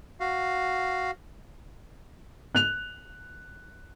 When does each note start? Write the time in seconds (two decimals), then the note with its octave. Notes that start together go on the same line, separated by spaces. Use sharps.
0.20 F#4 F5
2.55 F#6 F7